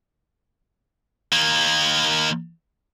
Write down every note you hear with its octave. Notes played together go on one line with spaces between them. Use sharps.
D#3 A#3